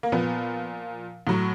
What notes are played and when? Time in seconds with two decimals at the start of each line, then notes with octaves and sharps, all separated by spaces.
0.03 A#3
0.12 A#2 F3 B3
1.27 A2 F#3